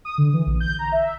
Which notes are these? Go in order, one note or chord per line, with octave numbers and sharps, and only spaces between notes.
D#6
D3
E3
A#1
G6
A#5
E5